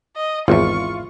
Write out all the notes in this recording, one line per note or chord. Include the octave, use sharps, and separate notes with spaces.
D#5
G#1 E2 E4 F4 C#6